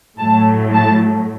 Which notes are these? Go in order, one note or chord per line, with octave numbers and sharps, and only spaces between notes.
A2 F#3 A3 A5
A5